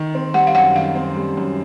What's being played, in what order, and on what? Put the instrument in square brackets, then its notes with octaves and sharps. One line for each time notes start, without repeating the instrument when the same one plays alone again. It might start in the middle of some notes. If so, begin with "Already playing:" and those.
Already playing: [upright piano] D#3
C4
[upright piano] G3 [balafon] F#5
[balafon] F5
[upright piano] F#2 [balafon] F#5
[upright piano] D#3 [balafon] F5
[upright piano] C4
G3
F#2